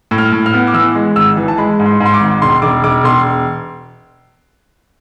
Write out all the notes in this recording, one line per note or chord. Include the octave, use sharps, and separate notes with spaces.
A2
F6
A2
F6
B3
D6
E3 E6
G#3
G#1 E6
E3
A5
G#3 B5
G#2
C6
G#2
C6
D6
G#1
E1 C6
E1 D6
E1 D6
E1 C6